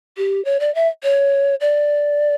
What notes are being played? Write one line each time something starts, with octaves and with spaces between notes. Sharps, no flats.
G4
C#5
D5
E5
C#5
D5